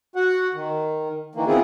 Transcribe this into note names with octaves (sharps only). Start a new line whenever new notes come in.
F#4 F#5
D#3
D#3 E3 A#3
B3 C4 E4 F4 G#4